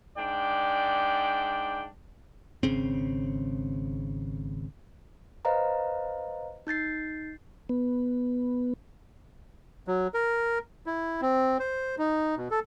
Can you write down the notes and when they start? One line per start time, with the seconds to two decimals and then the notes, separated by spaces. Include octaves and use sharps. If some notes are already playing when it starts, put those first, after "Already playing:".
0.17 G#2 D4 D5 G5
2.63 G#1 C#3 C4
5.45 B4 C5 D#5 F5 A#5
6.67 D#4 G6 A6 C7
7.69 B3
9.88 F#3
10.14 A#4
10.86 E4
11.22 C4
11.60 C5
11.98 D#4
12.37 B2
12.51 A4